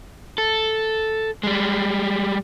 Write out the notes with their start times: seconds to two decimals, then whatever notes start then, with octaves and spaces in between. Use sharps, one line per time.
0.38 A4
1.43 G3 G#3